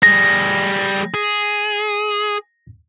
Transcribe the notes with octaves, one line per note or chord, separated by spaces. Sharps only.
G3 G#4 A#6
G#4